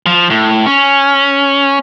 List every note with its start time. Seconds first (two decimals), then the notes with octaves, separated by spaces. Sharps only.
0.06 F3
0.30 A2
0.66 C#4